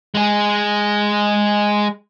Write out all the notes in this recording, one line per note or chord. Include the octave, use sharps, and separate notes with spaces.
G#3 G#4